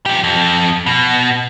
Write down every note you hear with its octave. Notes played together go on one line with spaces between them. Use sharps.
F3 G4
F2
B2